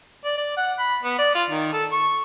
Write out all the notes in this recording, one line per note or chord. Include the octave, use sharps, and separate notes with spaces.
D5
D5
F#5
B5
B3
D5
F4
D#3
A4
C#6